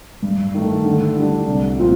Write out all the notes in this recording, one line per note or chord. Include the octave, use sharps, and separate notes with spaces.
G2
D#3 A3
D3
G3 D4
C2
A#2 F3 C4 F4